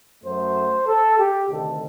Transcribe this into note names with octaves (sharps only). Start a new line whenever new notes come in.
F#2 F#3 A3 C5
A4
G4
D2 C3 D#3 A4